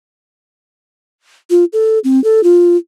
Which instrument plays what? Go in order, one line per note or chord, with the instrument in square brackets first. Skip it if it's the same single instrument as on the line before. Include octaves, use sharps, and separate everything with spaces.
[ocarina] F4
A4
C4
A4
F4